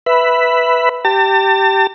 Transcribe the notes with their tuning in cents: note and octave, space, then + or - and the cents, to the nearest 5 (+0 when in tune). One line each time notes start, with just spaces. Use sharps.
B4 +0 E5 +0 B5 +10
G4 -10 A5 +40